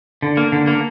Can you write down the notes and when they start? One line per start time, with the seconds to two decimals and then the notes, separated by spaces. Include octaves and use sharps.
0.22 D3
0.37 A#3
0.52 D3
0.67 A#3